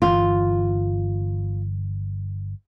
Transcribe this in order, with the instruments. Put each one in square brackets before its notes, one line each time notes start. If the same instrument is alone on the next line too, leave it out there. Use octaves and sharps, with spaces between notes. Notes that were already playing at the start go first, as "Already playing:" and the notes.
[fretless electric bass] G1 E3 [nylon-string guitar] F4